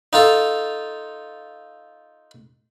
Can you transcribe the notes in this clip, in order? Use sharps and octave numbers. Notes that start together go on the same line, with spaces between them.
D#4 F4 A4